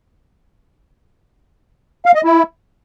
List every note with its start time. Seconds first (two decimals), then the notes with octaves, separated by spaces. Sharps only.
2.06 F5
2.15 D#5
2.25 E4